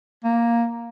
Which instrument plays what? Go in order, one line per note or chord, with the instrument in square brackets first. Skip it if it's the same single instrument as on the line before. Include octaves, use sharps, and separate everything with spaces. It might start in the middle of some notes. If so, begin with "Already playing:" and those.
[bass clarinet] A#3